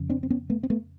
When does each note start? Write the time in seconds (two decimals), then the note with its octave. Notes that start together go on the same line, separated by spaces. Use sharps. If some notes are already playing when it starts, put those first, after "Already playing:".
Already playing: F2 C#3
0.10 C4 D4
0.23 C4
0.30 B3 C#4
0.50 A3 B3
0.63 C4
0.70 A3 B3